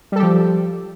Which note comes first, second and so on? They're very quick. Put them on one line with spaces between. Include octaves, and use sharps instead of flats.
G3 A4 G4 F3